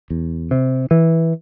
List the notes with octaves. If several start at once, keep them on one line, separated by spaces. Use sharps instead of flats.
E2
C3
E3